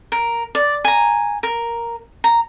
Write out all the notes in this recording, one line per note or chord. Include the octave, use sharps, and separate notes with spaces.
A#4
D5
G#5 A#5
A#4
A#5